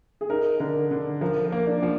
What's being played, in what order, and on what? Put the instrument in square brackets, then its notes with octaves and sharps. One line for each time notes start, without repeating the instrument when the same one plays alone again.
[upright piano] G#4
[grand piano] D#4 [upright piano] A#4
[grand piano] D3 [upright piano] A#4
[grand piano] D3
[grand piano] F3 [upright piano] A#4
[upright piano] A#4
[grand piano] A#3
[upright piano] D4
[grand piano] F3